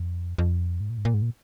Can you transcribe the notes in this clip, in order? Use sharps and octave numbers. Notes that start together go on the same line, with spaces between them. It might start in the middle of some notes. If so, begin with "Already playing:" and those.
Already playing: F2
F2
G#2
A#2
G#2
A#2
G#2
A#2